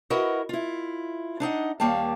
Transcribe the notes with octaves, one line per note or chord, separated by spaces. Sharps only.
E4 F#4 A#4 B4 D#5 F#5
E4 F4
D4 D#4 D#5 F#5
D#2 G3 A#3 F5 G5 A5